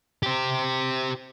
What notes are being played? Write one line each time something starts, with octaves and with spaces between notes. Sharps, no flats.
G4 C5